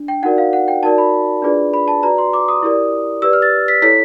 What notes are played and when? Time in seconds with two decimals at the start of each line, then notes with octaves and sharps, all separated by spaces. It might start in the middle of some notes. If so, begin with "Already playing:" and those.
Already playing: D4
0.08 G5
0.23 D#4 F#4 A#4 D5 F#5
0.38 F5
0.53 F#5
0.68 G5
0.83 D#4 F#4 A#4 D5 A5
0.98 B5
1.42 D4 F4 G#4 B4 D5
1.74 B5
1.88 A5
2.03 F#4 B4 D5 A#5
2.18 C6
2.33 D6
2.48 D#6
2.63 E4 G4 A#4 D5
3.22 G4 B4 D5 E6
3.33 F6
3.42 A6
3.68 B6
3.82 E4 A4 C#5 B6